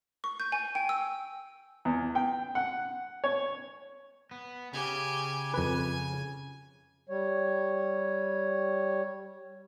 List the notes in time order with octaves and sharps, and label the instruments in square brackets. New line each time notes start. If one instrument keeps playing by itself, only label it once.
[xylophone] C#6
G6
G#5
G5
E6
[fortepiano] E2
G5
F#5
C#5
[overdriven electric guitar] B3
[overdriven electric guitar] C#3 [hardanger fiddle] G4 G#5
[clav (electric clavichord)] F2 B4 [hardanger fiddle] G#5
[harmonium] G3 C#5